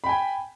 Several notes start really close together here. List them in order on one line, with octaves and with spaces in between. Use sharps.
B5 G5 G#5